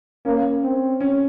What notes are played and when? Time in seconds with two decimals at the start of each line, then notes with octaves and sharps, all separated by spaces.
0.25 A#3 C#4
0.63 C4
1.00 C#4